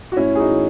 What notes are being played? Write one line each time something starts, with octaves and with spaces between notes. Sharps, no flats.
F#4
A2 C#4 E4
G#4
D#4 F#4
E3